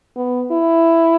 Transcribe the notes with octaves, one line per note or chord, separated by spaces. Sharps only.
B3
E4